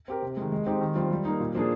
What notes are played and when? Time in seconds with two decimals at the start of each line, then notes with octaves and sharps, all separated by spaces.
0.08 C4 G4 A#4
0.22 C3
0.37 D#3 G#3
0.52 G#3
0.66 C4 D#4 G4
0.81 D#3
0.95 G3 C4 F4
1.11 G3
1.25 A#3 D#4
1.40 A#2
1.55 F3 A#3 D4 G#4